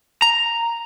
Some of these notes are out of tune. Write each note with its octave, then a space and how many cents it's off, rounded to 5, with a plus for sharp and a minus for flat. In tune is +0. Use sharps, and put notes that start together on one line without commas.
A#5 +0